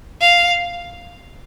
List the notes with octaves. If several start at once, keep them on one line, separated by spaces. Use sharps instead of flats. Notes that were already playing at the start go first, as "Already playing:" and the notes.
F5